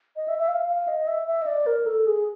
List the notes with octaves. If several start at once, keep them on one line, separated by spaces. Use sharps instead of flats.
D#5
E5
E5
F5
F5
D#5
E5
E5
D#5
D5
A#4
A4
G#4